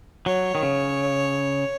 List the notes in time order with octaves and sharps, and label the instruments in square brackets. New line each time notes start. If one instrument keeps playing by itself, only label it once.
[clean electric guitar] F#3 [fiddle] C#5
[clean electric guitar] D#3
C#3